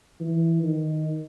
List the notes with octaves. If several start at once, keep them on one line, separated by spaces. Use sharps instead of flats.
E3
D#3